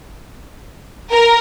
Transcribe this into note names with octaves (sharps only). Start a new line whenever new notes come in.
A#4